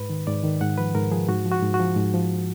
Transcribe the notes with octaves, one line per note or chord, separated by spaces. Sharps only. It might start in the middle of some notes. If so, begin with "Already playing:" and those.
Already playing: G#2 B4
D#3
G#2 D5
D#3
G#2 F#5
F3 B4
G#2 A#4
F3 G#4
G#2 F#4
F3
F#4
G#2
F#4
F3
G#2
F3